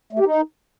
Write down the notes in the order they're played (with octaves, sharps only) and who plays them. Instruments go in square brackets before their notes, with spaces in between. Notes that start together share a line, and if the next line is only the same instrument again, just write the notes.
[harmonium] A3
G4
D#4